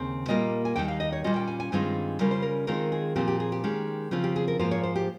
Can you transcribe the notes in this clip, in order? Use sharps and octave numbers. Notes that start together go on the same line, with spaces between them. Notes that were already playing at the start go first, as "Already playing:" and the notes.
Already playing: D#2 C#3 C4
A#2 G3 A#3 F4 D#5
G#5
D#2 D#3 G3 G5
F5
D#5
C#5
A#2 G3 C#4 F4 D#5
G5
G#5
G#5
G2 D#3 G#3 C4 F4 G#5
C#3 G3 C#4 F4 A#4
C5
A#4
D#3 G#3 C4 F4 A#4
G#4
A#2 F3 C4 F4 G4
G4
G#4
G4
D#3 G#3 C#4
C#3 F3 C4 F4
G4
G#4
A#4
G#2 F3 A#3 F4 C5
C#5
C5
G4